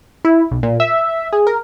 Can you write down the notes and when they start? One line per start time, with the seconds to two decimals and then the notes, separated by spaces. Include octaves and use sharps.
0.25 E4
0.51 B1
0.63 A#2
0.80 E5
1.33 G#4
1.47 A#4